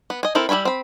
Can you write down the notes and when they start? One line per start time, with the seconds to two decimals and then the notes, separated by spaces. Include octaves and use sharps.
0.10 B3
0.23 D#5 G#5
0.35 C4 E4 A4 A#4
0.49 G3 E4 F4 G#5 B5
0.65 C4 B5